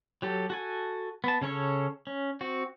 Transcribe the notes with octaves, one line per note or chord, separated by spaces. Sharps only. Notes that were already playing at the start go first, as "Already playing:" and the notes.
F#3 G4 A4
F#4 A4 G#5
B3 A5
C#3 C#4 A4 C#5
C#4
C4 F#4